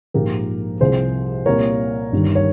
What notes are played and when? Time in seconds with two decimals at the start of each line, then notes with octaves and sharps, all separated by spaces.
0.14 A#1 G#2 F3 A#3 G4 A#4
0.80 C2 C3 F3 G#4 C5
1.46 C2 A#2 G3 A#3 A#4 C#5
2.12 G1 G2 D#3 G3
2.35 C#5